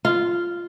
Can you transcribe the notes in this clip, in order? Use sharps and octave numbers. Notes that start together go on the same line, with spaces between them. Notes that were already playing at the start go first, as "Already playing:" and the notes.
F4